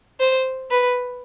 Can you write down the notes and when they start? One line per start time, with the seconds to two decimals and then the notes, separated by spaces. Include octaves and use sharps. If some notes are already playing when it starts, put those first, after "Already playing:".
0.20 C5
0.71 B4